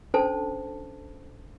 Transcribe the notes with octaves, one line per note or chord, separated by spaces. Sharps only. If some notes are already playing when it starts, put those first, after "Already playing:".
C#4 D4 A4 C5 A5